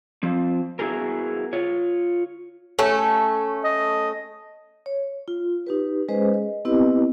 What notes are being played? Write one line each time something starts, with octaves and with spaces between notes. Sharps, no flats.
F3 C4
B3 E4 F#4 G#4 A#4
F4 C#5
A3 C#4 A4
D#5
C#5
F4
D#4 G4 B4
G#3 C#4 G#4 B4 C5 D#5
D#5
B3 C4 E4 G4 B4 D#5